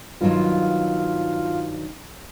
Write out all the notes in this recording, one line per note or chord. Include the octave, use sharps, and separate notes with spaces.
G2 D#3 F#3 F4